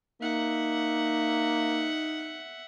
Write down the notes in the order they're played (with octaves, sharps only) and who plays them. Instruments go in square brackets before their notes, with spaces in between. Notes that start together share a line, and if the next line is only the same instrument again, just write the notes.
[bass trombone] A#3 [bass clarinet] D#4 [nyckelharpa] E5 F#5